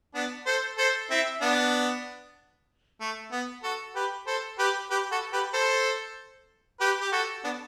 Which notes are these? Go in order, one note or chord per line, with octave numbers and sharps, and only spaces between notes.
B3 D4
A4 C5
A4 C5
C4 E4
B3 D4
A3
B3
F#4 A4
G4 B4
A4 C5
G4 B4
G4 B4
F#4 A4
G4 B4
A4 C5
G4 B4
G4
F#4 A4
B3 D4